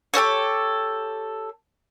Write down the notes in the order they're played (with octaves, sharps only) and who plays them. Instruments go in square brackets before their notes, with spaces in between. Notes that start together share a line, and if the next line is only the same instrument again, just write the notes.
[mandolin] G4 A4 C5 C#5